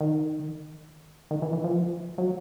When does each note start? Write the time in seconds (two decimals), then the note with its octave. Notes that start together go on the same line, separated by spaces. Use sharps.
0.01 D#3
1.31 D#3
1.42 E3
1.53 E3
1.64 F3
2.18 F#3